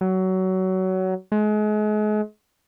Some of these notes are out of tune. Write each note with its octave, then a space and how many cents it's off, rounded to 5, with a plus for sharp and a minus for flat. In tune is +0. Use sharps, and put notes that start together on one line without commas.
F#3 +20
G#3 +35